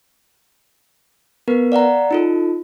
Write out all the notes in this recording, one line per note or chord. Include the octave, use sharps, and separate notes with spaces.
B3 A#4 B4
D5 F5 F#5 A#5
D#4 F4 A4